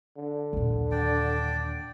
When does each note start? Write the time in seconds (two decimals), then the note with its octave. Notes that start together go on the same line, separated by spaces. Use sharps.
0.17 D3
0.53 D#2 A#2
0.91 D4 D5 G5